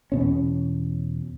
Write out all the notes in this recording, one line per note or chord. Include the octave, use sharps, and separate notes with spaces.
E2 B2 C#4